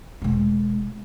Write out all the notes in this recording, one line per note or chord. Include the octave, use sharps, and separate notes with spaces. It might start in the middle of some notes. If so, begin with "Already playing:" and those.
E1 G#3